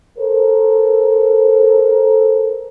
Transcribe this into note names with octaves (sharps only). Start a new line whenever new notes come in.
A4 A#4 C5